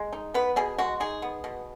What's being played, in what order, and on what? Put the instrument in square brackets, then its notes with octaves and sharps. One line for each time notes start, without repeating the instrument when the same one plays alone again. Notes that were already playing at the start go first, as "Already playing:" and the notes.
Already playing: [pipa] G#3
D#4
B3 B4
B2 G#4
G#3 F#4
D#4 G#4
B3
B2